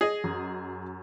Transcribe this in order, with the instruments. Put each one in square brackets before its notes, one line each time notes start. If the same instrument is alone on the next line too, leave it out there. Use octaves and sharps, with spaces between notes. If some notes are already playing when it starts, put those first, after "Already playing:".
[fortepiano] G#4 D#5
[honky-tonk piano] F#2